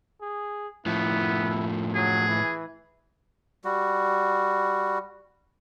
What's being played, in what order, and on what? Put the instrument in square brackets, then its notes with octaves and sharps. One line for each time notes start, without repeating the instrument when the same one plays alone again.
[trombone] G#4
[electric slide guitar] A2 F3 [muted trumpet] B3 [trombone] E4
[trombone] F#3 [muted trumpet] G#4
[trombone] E3
[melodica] G3 F#4